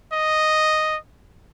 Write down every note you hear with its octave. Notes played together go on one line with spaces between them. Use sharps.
D#5